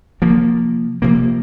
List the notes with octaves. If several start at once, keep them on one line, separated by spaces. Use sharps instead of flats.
C3 F3 A#3
C3 F3 A#3